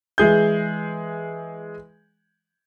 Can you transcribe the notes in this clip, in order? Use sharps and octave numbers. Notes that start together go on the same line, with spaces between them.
E3 G#3 G#4 G6